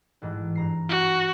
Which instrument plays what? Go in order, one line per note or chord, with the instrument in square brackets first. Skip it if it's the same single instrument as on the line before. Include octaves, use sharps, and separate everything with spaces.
[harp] A1 G#2 E3
G2 A#5 C7
[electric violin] F#4